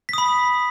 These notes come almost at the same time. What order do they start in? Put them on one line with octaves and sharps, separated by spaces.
B6 D#6 B5